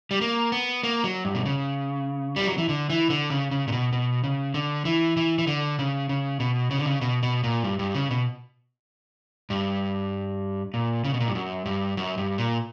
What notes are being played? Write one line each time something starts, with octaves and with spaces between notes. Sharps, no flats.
G3
A#3
B3
A#3
F#3
G2
B2
C#3
G3
F#3
E3
D3
E3
D3
C#3
C#3
A#2
B2
B2
C#3
D3
E3
E3
E3
D3
C#3
C#3
B2
C#3
D3
C#3
B2
B2
A#2
G2
G2
C#3
B2
G2
A#2
C#3
B2
A#2
G2
F#2
G2
F#2
G2
A#2